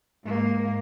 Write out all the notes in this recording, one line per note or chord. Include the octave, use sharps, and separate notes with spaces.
G#2 A#3